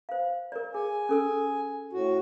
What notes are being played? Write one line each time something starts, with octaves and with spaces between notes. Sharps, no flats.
C5 F5
A#4 D5
G#4 G#5
C#4 A4 E6
A2 F#4